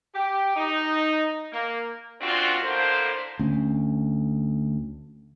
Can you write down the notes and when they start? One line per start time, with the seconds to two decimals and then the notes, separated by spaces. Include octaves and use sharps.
0.15 G4
0.56 D#4
1.52 A#3
2.21 F#2 A#2 C4 D4 F4 F#4
2.62 A2 D3 A#3 C5
3.39 D2 C#4